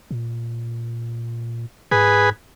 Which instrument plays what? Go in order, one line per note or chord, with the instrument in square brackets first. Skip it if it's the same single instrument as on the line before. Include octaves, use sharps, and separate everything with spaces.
[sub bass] A#2
[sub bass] G#2 [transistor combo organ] G#4 B4